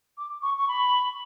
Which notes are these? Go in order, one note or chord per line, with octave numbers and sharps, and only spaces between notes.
D6
C#6
C#6
B5